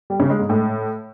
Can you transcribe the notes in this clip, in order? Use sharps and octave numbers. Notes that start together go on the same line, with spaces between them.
G3
C#3
G#3
G#2
A2